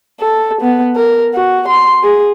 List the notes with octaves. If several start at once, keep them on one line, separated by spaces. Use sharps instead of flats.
A4
B3
A#4
F#4
C6
G#4